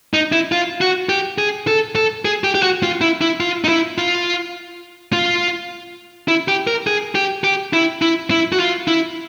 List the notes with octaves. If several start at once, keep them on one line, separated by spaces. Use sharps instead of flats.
D#4
E4
F4
F#4
G4
G#4
A4
A4
G#4
G4
G4
F#4
F4
E4
E4
F4
D#4
E4
F4
F4
E4
G4
A#4
G#4
G4
G4
E4
E4
E4
F#4
F4
E4